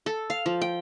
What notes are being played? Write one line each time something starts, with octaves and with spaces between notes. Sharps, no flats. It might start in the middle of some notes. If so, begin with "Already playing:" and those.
A4
F5
F3
G5